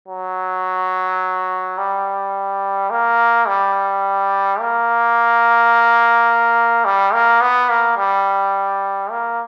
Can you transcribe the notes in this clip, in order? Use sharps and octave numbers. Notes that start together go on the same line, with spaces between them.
F#3
G3
A#3
G3
A#3
G3
A#3
B3
A#3
G3
A#3